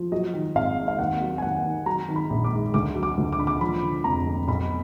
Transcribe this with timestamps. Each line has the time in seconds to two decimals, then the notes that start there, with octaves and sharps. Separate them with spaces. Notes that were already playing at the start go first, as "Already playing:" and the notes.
Already playing: F3
0.12 F#3 D#5
0.34 D#3
0.55 G#1 F5
0.77 G#2
0.88 F5
0.99 D#2 F#5
1.21 F#3
1.38 G#5
1.42 D#2 F#5
1.64 D#3
1.86 F#3 A#5
2.08 D#3
2.16 B5
2.30 A#1
2.44 D6
2.52 G#2
2.74 D2 D6
2.95 F#3
3.03 D6
3.18 D2
3.32 D6
3.39 D3 B5
3.47 D6
3.61 F3 B5
3.83 D3
4.04 F1 A#5
4.26 F2
4.48 B1 B5